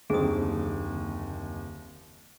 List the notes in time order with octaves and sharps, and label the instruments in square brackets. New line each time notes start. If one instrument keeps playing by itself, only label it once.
[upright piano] F#1 D#2 [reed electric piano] D3 C4 [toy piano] G#4 D#6